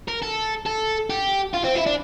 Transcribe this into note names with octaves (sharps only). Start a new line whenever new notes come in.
A#4
A4
A4
G4
F4
C4
E4
D4